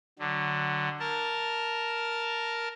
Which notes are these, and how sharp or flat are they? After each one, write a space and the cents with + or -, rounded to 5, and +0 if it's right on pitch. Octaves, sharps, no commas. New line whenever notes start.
D3 +15 F#3 +10
A#4 +0 A5 +0